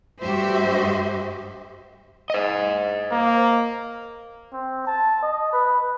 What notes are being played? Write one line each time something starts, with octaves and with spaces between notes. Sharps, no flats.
G2 A3 F#4 G4 C5 E5
C5 D#5
A#3
C4
A5
D#5
B4